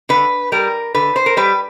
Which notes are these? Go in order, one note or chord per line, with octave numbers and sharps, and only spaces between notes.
D3 B4
G3 A#4
D3 B4
C5
A#4
G3 B4